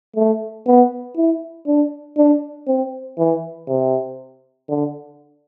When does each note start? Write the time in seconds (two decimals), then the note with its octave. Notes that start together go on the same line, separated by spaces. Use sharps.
0.16 A3
0.67 B3
1.17 E4
1.67 D4
2.17 D4
2.68 C4
3.18 E3
3.68 C3
4.69 D3